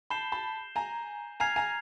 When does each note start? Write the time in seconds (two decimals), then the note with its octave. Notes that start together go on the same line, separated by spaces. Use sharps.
0.10 A5 B5 G6 C7 E7 G7
0.32 A5 B5
0.76 G#5 A#5
1.40 G#5 A#5 F6 G#6 C7 F7
1.56 G#5 A#5